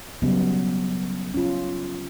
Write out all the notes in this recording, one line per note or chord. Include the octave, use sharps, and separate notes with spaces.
C#3 F#3 G3 B3 C#4
C#4 F4